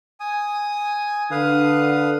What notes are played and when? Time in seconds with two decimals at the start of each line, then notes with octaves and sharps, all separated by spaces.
0.20 G#5 D#6
1.31 D3 B4 F5 D#6